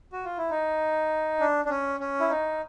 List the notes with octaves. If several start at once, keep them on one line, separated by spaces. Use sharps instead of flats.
F#4
F4
E4
D#4
D4
D4
C#4
C#4
E4
D#4